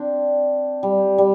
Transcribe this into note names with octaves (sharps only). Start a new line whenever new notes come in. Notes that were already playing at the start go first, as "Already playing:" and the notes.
Already playing: C4 D4
G3
G3